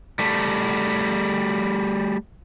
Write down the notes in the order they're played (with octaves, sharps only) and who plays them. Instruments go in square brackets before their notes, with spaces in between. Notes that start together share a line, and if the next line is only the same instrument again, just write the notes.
[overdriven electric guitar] G3 A3